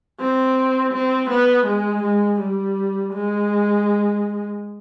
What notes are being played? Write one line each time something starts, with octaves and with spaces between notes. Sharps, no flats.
C4
C4
B3
G#3
G#3
G3
G#3